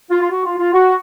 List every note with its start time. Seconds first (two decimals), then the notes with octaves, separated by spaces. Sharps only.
0.10 F4
0.22 F4
0.31 F#4
0.45 F4
0.59 F4
0.73 F#4